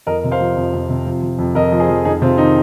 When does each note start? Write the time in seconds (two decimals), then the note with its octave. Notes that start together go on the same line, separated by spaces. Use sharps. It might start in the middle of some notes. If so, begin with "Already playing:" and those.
0.07 F2 A#4 D#5
0.24 C3
0.31 C5 F5
0.40 F3
0.57 F2
0.74 F2
0.89 C3
1.06 F3
1.23 F3
1.39 F2
1.55 F2 A#4 D#5
1.72 F3
1.80 G#4 C5
1.89 F3
2.05 F2 D#4 G#4
2.22 C3 C4 F4
2.38 D#3 D#4